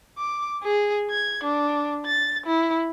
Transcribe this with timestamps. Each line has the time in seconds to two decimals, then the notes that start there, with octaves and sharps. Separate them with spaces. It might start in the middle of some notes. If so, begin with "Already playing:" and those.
0.18 D6
0.64 G#4
1.11 G#6
1.44 D4
2.06 A6
2.47 E4